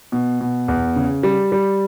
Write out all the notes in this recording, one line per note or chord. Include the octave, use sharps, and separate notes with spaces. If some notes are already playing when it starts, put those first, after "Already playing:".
B2
B2
E2
C#3
G3
G3